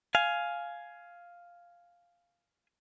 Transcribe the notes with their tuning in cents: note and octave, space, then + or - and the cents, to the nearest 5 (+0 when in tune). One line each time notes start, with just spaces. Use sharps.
F5 +0 G#5 +10